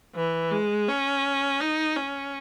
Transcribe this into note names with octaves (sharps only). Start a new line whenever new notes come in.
E3
G#3
C#4
D#4
C#4